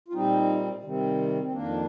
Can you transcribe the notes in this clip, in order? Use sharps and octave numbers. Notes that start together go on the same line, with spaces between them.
F4
A#2 G3 C4 D#4
C3 D#3 G3 C4
C4
F2 D#3 A#3 D4